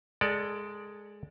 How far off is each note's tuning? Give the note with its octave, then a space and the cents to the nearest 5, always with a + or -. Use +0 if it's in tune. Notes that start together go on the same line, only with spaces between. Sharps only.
G#3 +0 A4 +25 D5 +0